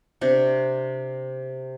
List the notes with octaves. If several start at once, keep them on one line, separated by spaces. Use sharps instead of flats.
C3 D4 C#6